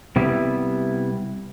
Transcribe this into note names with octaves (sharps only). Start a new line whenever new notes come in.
C3 G3 B3 E4